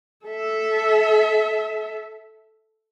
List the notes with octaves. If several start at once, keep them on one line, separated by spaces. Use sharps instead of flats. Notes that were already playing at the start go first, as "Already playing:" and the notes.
A4 E5